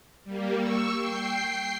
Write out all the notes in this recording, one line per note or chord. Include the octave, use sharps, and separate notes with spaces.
G3 A#3
C#6 E6
G5 C7